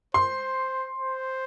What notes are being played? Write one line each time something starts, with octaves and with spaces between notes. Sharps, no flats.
C5 C6
C5